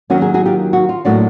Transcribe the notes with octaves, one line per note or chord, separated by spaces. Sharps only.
D#3 F#3 A#3 C#4 F#4
F#4 G#4
F#4 G#4
F4 G4
F#4
F4
A2 F#3 A#3 D4 F#4